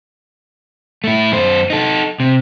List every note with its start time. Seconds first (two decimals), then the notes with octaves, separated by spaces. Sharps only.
1.04 A3 E4
1.32 F#2 C5
1.70 D#4 A4
2.20 C3